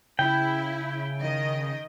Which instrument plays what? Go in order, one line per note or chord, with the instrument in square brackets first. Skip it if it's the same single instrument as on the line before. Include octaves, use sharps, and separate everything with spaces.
[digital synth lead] C#3 [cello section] E4 [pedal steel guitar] G5
[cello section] D#3 D#5